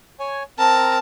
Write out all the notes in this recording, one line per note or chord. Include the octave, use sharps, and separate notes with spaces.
C#5 G#5
C4 A#4 A5 A#5